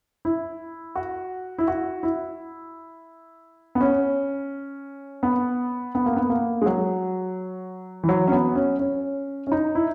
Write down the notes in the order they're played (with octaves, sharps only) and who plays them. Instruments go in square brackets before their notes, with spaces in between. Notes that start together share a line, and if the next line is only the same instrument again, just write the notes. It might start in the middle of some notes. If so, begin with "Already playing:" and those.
[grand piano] E4
F#4
E4
F#4
E4
B3
C#4
B3
B3
A#3
B3
A#3
G#3
F#3
E3
F#3
C#4
B3
C#4
C#4
C#4
D#4
E4